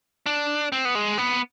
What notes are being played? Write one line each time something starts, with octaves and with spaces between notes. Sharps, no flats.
D4
C4
B3
G#3
B3